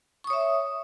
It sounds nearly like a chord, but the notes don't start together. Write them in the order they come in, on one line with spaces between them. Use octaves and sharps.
C#6 D#6 C#5 E5